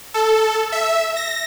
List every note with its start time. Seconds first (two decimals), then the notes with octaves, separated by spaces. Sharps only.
0.14 A4
0.72 E5
1.16 A#6